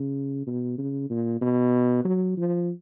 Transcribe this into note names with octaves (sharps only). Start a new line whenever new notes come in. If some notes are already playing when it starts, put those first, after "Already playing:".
Already playing: C#3
B2
C#3
A#2
B2
F#3
F3